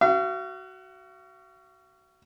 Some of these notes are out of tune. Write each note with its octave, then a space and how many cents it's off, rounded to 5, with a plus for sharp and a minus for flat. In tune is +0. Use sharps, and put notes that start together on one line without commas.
F#4 +20 F5 -40